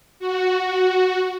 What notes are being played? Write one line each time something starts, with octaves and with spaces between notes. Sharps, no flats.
F#4